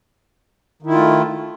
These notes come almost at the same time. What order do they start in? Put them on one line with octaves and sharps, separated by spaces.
D#3 E4 F4 A3